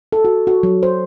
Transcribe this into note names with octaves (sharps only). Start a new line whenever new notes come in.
A4
F#4
F#4
F#3
C5